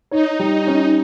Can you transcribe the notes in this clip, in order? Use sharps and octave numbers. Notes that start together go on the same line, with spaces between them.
D#4 C#5
G3
C#4